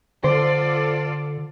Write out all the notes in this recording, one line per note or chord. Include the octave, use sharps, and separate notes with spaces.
D3 F4 A4 C5 D5